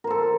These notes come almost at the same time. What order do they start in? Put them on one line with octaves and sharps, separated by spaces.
A#4 C5 A4